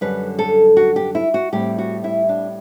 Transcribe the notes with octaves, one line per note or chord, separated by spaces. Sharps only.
F#2 D3 G3 B4
A4
F#4
G4
E4
F#4
A2 G3 C4 G4
F#4
E4
D4